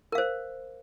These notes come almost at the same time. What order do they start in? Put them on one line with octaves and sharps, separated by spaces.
A#4 F5 C5